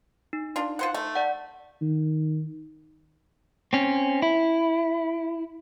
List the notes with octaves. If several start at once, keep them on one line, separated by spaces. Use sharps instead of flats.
D#4
D4 F4
F4 C5 F#5
A3
D5 F#5
D#3
C4 C#4
E4